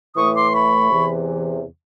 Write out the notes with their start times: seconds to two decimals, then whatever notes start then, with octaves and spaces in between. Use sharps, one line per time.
0.16 A2 E3 A3 C#6 D#6
0.35 C6 D6
0.53 B5 C#6
0.91 E2 C3 E3